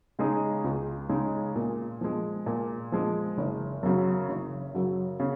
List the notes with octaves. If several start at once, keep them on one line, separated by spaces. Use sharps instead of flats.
C#3 G#3 D#4 G#4
C#2
C#3 G#3 D#4 G#4
A#2
F3 G#3
A#2
F3 G#3
F#1
F#2 C#3 F#3
F#1
F#2 C#3 F#3
C#3